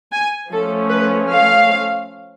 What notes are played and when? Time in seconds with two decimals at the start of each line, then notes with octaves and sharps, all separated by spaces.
0.12 G#5
0.51 F3 A3 C#4 A4
0.91 B4
1.30 F5